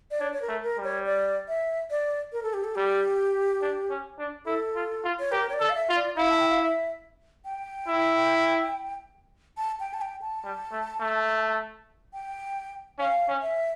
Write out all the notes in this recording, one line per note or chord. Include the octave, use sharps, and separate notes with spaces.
D5
D4 C#5
C#5
A#4
A3
A#4
G3
C#5
D5
E5
D5
A#4
A4
G4
A4
G3 G4
D4
C#4
D4
E4 A4
F4
F4
C#5
G4 A#4
C#5
D5
A4
F5
E5
F4
D5
E4 F5
A5
G5
F5
E5
G5
E4
A5
G5
A5
G5
A5
G3
A3
A3
G5
C#4 F5
C#4
E5